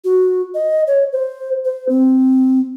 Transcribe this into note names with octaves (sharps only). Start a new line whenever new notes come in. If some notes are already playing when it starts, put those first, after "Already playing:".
F#4
D#5
C#5
C5
C5
C4